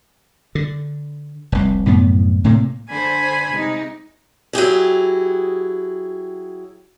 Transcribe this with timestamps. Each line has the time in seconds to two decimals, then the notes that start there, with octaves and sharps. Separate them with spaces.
0.55 D3
1.52 F1 C2
1.86 C2 F#2 A2 B3
2.44 A2 C3 A3 A#3
2.90 D3 C5 G#5 B5
3.51 C3 G#3 D#4
4.53 F#3 E4 G4 G#4